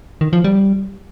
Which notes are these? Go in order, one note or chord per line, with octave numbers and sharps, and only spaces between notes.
D#3
F3
G3